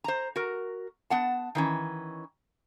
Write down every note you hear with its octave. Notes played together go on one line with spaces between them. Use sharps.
C5 A#5
F#4 A#4
B3 F#5 A5
D#3 E3 C#4